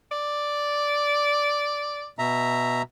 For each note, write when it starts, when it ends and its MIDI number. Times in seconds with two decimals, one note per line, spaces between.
0.11 2.08 74
2.19 2.82 47
2.19 2.82 76
2.19 2.82 82